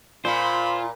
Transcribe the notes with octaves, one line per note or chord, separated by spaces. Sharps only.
A#2 F4 C5 B5